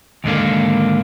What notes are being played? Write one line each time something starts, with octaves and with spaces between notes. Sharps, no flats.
D#2 G#2 D3 A#3